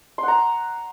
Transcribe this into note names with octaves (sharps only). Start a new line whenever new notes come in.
F#5 A#5 C6